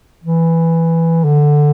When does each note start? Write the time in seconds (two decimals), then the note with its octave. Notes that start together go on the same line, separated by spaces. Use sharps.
0.24 E3
1.24 D3